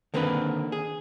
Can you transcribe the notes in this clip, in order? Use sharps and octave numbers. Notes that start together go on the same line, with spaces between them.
D3 D#3 A#3 C4 D4 B4
G#4